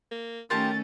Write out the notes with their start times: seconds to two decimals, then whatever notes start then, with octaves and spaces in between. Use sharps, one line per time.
0.11 A#3
0.50 D#3 A3 C#4 F4 G4 A#4 A5 A6